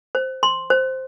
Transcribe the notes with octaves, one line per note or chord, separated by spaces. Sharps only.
C5
C6
C5